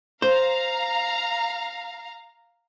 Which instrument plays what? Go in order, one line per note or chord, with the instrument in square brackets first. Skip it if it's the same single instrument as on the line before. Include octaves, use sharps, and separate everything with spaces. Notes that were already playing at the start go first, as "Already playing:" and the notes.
[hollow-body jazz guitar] C5 [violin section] F5 A#5